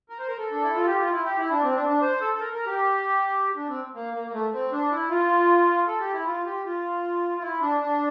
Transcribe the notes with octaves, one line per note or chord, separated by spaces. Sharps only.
A#4
C5
A#4
A4
D4
E4
F4
G4
F4
E4
G4
E4
D4
C4
D4
D4
C5
A4
A4
A#4
A#4
G4
D4
C4
A#3
A#3
A#3
A3
C4
D4
E4
F4
A4
G4
E4
F4
G4
F4
F4
E4
D4
D4